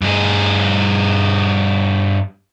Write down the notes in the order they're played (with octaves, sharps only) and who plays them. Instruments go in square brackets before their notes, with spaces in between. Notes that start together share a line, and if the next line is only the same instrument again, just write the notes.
[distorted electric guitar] G2 G#4